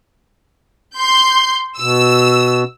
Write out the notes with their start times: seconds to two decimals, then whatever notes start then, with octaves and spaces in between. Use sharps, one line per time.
0.97 C6 G6
1.80 B2 E6